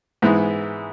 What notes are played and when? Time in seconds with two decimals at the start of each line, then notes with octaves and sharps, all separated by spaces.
0.22 G#2 E3 G#3 B3 E4